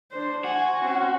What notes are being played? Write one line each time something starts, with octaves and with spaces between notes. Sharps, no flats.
D4 C5
F#4 G#5
C4 C#4